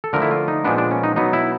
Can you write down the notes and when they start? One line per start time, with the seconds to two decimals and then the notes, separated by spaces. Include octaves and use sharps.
0.04 A4
0.13 D3 F3 A3 A#4
0.22 E4
0.31 F4
0.48 D#4
0.64 A#2 F3 G#3 B3 D4
0.78 D4
0.91 C#4
1.03 D#4
1.16 B2 F#3 B3 D#4
1.33 E4